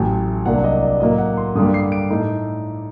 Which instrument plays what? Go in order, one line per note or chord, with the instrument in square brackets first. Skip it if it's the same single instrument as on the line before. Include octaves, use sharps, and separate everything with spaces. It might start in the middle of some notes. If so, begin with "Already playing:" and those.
Already playing: [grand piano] A1 A2 F#3 A3 G5
C2 C3 F#3 A#3 D4 F#5
D#5
D5
A2 F#3 A#3 D#5
F#5
C6
G2 D3 G3 A#3 D#6
C7
D7
A2 A3 D#4